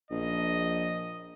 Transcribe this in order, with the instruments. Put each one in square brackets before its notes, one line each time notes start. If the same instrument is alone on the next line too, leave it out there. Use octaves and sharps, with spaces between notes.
[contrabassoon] A#1 [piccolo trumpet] D#5